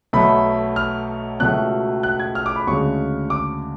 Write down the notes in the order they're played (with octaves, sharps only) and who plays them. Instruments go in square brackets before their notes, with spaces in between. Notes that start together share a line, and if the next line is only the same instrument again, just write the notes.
[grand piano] B1 B2 A3 B5
F6
C#2 B2 F#3 A3 F#6
F#6
G#6
F6
D6
B5
D2 C#3 G#3 C#6
D6